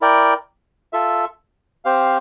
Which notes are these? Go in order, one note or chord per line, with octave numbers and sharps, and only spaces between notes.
E4 A#4 D5 G5
F4 A4 E5
C4 G4 C5 F5